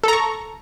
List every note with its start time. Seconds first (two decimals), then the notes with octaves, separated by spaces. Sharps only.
0.04 A4
0.08 A#5
0.13 C#6